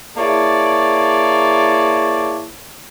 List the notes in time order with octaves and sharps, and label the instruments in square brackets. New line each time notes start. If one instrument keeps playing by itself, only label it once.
[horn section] A#3 E4 G#4 C#5 D5 A5